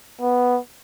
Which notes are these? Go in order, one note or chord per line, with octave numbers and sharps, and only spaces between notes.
B3